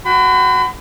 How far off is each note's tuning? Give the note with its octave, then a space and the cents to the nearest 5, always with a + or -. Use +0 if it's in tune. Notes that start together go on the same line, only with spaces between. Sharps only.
F#4 +0 G5 +5 B5 +40